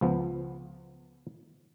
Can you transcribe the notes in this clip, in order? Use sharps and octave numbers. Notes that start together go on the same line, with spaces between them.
C#2 F3 B3